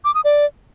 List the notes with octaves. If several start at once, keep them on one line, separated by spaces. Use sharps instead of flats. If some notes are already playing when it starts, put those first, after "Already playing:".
D6
D#6
D5